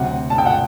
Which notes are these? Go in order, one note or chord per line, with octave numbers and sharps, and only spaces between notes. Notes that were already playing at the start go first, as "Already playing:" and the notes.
Already playing: D2 C3 F#3 C4 F#5
A5
G5
F#5